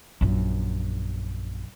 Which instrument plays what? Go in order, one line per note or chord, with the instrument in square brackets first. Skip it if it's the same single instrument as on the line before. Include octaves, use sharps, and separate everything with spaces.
[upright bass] A#1 F#2